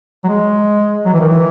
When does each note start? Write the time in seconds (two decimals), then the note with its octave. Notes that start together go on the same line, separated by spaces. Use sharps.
0.24 F#3
0.28 G#3
1.05 F#3
1.14 E3
1.20 D#3
1.28 E3